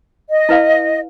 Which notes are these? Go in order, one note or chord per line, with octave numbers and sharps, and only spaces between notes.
D#5
E4 B4 F5